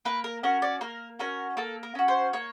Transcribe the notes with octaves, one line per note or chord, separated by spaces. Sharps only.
A#3 B4
A#4
C#4 F#4 A#4
D5
A#3 A#4
C#4 F#4 A#4
A#3 A4
A#4
C#4 F#4
C5
A#3 C#5